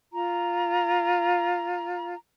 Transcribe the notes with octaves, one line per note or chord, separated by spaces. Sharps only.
F4 A#5